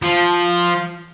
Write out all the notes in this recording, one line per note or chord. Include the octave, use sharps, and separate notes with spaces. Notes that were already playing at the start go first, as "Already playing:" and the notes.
F3